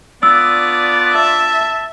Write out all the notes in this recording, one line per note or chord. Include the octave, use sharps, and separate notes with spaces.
B3 D4 F4 D5 E6
E5 A5